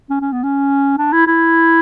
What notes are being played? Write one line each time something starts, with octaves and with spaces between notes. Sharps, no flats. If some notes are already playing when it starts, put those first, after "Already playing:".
C#4
C#4
B3
C#4
D4
E4
E4